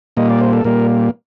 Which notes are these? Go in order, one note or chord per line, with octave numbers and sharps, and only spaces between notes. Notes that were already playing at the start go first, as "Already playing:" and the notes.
A#2 G3 A#3 D#5
D5
C5
A4
A#2 G3 A#3 A#4